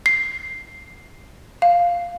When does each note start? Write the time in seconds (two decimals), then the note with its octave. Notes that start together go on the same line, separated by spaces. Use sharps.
0.06 C7
1.62 F5